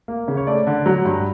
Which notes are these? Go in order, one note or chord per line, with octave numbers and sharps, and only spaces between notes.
A#3
C#3
C#5
A3 D5
D3
F#3
G2